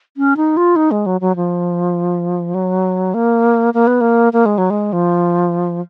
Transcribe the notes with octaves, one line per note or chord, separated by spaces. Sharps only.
C#4
D#4
F4
D#4
G#3
F#3
F#3
F3
F#3
A#3
A#3
B3
A#3
A#3
G#3
F#3
G#3
F3